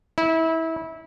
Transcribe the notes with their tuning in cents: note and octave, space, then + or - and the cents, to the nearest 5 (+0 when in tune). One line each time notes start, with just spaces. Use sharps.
E4 -25